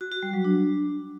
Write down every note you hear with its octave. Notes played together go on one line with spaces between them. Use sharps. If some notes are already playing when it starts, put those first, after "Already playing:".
F#4
F#4
G3
F#3
D4